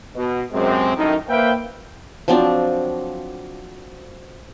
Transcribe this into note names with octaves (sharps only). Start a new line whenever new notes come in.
B2
F#2 C3 G#3 C4
F#2 A2 D#3 D#4
A#3 B4 C5 E5 F5 G5
F3 F#3 C4 D4